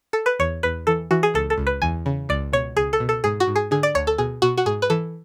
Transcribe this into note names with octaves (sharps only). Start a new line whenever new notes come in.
A4
B4
E2 C#5
E2 B4
E3 A4
E3 F#4
G#4
C#2 A4
A4
C#2
B4
E2 G#5
C#3
C#2 D5
B2 C#5
C#2 G#4
A4
B2
A4
G#2 G#4
F#4
G#2
G#4
D3 G#4
D5
D2 C#5
A4
B2 G#4
B2 F#4
F#4
G#2 G#4
B4
E3 A4